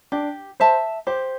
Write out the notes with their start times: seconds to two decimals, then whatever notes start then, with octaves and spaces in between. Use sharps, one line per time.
0.12 D4 G4
0.60 C5 E5 A5
1.07 G4 C5